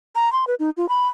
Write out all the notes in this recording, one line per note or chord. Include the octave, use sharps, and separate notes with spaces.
A#5
C6
B4
D#4
F4
B5